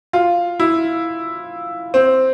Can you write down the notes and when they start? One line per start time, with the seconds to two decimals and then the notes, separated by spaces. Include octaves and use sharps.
0.13 F4
0.60 E4
1.94 C4